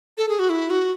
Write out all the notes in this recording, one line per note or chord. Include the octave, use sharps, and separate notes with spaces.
A4
G#4
F#4
E4
F#4